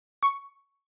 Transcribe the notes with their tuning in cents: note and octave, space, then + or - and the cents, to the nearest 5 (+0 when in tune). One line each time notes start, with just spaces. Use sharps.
C#6 +5